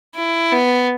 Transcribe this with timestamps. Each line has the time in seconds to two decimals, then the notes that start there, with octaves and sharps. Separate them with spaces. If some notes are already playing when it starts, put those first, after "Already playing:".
0.15 E4
0.52 B3